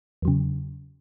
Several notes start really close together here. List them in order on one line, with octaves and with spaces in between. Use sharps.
E2 F#3 C#3